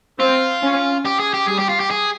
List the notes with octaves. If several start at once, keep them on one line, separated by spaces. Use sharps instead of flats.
C4 F4
C#4
G4
G#4
G4
G3 G#4
G4
F4
G4
G#4